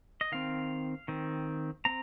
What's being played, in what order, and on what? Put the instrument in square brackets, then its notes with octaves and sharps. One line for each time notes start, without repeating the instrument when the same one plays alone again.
[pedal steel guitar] D#5
D#3 C4 F5
D#3 C4
C4 A#5